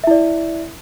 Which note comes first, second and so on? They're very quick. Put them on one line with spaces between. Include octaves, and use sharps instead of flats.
E5 E4 D5